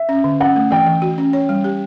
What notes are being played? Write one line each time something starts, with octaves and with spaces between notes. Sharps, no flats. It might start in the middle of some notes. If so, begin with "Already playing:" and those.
Already playing: E5
C#4
D3
C#4 F#5
A3
E3 G5
E3
F#4
C#4
C#5
G3
G4